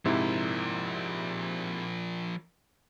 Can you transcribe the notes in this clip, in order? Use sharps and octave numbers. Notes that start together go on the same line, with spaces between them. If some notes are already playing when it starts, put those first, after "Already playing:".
G#2 C3 F3 E4 A#4